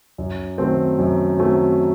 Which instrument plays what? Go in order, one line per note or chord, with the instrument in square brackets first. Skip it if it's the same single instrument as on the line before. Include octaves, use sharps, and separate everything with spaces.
[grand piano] F#2
D#3 F#3 A3 C4
F#2
D#3 F#3 A3 C4